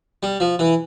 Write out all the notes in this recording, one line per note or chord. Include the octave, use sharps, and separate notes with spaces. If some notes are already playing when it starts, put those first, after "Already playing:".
G3
F3
E3